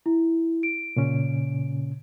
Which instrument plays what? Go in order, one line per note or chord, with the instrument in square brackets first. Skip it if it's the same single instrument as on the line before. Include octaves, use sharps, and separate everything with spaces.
[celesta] E4
D7
[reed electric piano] A#2 C#3 C#4